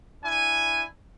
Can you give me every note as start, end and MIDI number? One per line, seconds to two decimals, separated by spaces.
0.23 0.84 62
0.23 0.84 64
0.23 0.84 80